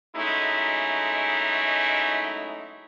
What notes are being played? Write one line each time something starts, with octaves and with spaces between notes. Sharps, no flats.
F#3 G#3 A3 C#4 D#4 E4